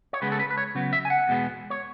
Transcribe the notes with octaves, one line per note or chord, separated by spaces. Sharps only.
C#5
C#3 G#3 B3 B4
A4
B4
B4
C#5
C#3 F#3 B3
E5
G#5
F#5
E2 B2 G#3 B3
C#5